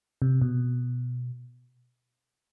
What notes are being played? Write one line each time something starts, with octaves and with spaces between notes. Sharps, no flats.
C3
B2